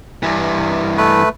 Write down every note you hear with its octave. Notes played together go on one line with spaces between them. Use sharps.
G2 E3
A3 B4